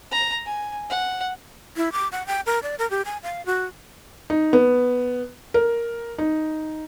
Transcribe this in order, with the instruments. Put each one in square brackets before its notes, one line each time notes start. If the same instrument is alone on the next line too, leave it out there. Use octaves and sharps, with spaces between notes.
[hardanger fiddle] A#5
G#5
F#5
[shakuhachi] E4
D6
F#5
G5
A#4
D5
A#4
G4
G#5
F5
F#4
[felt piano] D#4
B3
A#4
D#4